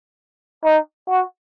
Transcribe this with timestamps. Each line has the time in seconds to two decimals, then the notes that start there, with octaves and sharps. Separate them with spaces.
0.65 D#4
1.08 F#4